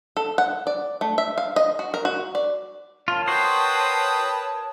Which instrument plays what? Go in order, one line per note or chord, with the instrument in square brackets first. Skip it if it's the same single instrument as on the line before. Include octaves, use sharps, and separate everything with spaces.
[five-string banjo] A4
F#5
D5
A3
E5
F5
D#5
F#4
A#4
F#4
D5
[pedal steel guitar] F4 [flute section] A#4 C#5 A5
[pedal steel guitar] F#4 C5 [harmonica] B4 G5 D#6